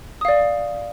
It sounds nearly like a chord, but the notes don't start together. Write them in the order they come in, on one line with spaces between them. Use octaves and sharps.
D#6 F5 D5